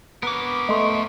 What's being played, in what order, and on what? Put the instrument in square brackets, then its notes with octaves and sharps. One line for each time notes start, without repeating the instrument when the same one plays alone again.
[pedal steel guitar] B3 B4 D6 [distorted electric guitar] A#4 C#5
[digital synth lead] A3 [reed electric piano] D#5 C6 C#6